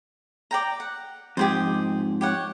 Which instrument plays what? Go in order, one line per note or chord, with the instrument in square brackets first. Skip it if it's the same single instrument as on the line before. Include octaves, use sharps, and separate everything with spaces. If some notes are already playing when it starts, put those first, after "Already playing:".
[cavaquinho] D5 G5 A#5
F#5
[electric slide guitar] F2 G#2 [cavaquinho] G4 G#4 C5
[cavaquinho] G4 C#5 F#5